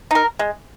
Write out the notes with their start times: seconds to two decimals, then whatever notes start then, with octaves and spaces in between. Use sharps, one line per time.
0.11 D#4 A#4
0.39 G#3